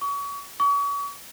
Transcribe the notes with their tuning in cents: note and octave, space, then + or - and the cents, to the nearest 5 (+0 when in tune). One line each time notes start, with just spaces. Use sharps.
C#6 +35
C#6 +40